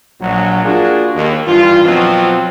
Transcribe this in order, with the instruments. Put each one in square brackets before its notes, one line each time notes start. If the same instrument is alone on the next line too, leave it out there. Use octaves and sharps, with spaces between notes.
[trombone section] A#1 F#3
A#3 D4 F4 F#4 G#4
D#2
G2 E3 F4
B2 F3 F#3 C4